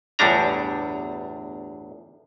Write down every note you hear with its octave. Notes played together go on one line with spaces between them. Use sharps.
G1 E2 A2 G3 D4 A#5